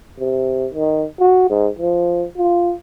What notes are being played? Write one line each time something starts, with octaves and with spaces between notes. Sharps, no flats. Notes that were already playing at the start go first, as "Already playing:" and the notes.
C3
D#3
F#4
G#2
F3
F4